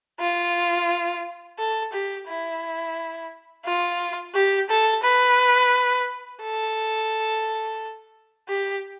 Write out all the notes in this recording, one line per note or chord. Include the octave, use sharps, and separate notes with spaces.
F4
A4
G4
E4
F4
G4
A4
B4
A4
G4